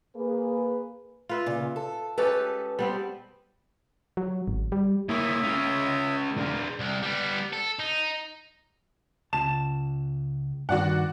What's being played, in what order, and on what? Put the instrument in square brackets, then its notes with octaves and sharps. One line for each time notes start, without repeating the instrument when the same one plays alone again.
[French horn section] A#3 G#4 B4
[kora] F4 B4 E5
[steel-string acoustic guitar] A#2 C#3
A4
[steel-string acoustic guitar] G#3 B4 A5 [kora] C#4 G4 A4
[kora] G3 B3 C4
[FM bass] F#3
G#1
G3
[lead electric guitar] A#3 E4 [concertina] C#5 E5 D#6
[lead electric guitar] G#3 C#4
[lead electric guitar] G#3 D4 [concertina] A#4
[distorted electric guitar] C2
G3 B3
A4
D#4
[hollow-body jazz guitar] C#2 A5 [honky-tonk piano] E7
[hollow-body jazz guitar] G2 D#3 [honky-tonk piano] F#4 D5 F#5